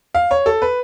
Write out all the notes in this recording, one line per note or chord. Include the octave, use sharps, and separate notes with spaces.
F5
C#5
A4
B4